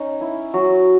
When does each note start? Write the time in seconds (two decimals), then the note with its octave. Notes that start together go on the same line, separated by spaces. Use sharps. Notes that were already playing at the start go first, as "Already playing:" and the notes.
Already playing: C#4 D#4
0.21 E4
0.54 F#3 F#4